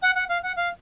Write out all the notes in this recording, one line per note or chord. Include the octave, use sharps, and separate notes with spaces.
F#5
F#5
F5
F#5
F5